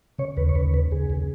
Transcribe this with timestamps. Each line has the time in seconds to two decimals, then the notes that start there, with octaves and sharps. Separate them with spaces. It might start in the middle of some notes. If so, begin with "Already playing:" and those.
0.18 C#3 C#5
0.37 D#2 B4
0.49 C#5
0.55 D#2 B4
0.74 C#3 B4
0.92 D#2 G#4
1.10 D#2